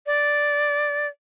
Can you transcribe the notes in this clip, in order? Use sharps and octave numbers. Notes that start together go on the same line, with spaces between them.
D5